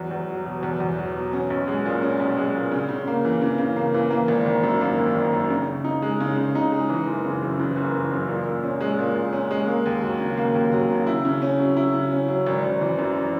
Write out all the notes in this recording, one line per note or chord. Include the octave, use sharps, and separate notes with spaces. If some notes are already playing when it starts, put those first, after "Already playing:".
Already playing: E2 F#3
E2
F#3
B2
E2
E2
F#3
B2
C#4
B1
G#3
A#2
C#4
B1
G#3
A#2
C#3
C#3
A#3
E3
C#3
C#3
A#3
E3
A#3
G#1
D#3
F#2
A#3
G#1
D#3
F#2
C#3
C#3
D#4
G#3
C#3
C#3
D#4
G#3
E3
F#1
C#3
F#2
E3
F#1
C#3
F#2
A#2
A#2
C#4
G#3
A#2
A#2
C#4
G#3
A#3
D#2
F#3
C#3
A#3
D#2
F#3
C#3
E4
C#3
C#4
F#3
E4
C#3
C#4
F#3
G#1
G#1
E3
F#2